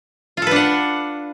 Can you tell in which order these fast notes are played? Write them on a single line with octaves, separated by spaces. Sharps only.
F4 A4 B4 D4 F#5